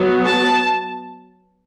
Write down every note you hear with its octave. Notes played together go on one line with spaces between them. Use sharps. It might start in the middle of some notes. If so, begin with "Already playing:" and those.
Already playing: F#3 B3
A5